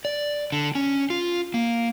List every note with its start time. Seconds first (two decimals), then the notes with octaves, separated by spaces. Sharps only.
0.05 D5
0.52 D3
0.75 C#4
1.10 F4
1.54 A#3